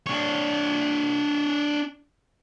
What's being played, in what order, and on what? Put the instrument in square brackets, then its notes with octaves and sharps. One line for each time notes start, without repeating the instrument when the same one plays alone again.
[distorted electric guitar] D4 C#5